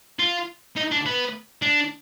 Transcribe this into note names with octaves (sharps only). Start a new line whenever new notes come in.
F4
D#4
D4
B3
D4